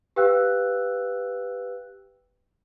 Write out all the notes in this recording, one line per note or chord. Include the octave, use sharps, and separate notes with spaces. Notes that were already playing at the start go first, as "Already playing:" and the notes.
G4 B4 F5 G5 E6 F#6